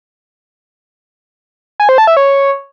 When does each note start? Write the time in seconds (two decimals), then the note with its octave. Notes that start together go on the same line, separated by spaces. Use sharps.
1.80 G#5
1.89 C5
1.98 A5
2.07 E5
2.17 C#5